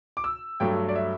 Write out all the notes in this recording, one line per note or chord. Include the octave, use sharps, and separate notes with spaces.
D6
E6
G2 F#3 A3 G5
D5
E5